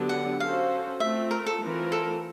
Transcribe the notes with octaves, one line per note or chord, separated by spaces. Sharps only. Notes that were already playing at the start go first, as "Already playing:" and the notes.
Already playing: D3 F#3 B3 D4 G4
F#5
C#4 F#4 A4 C5 F5
A3 C4 F4 E5
A#4
A4
E3 A3 C4 F4 A#4
A4